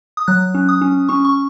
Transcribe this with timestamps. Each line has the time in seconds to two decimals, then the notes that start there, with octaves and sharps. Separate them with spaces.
0.17 D#6
0.28 F#3 F#6
0.55 C#4
0.69 D#6
0.82 C#4
1.09 C#4 C#6
1.25 C#6